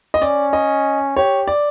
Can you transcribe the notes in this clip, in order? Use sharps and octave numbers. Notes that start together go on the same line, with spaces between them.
D#5
C#4 D5
D#5
G4 C#5
D5